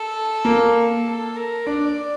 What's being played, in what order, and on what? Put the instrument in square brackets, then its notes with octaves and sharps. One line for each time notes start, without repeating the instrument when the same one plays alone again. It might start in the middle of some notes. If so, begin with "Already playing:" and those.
Already playing: [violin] A4
[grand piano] A#3
[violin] A4
A#4
[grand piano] D4 [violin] D5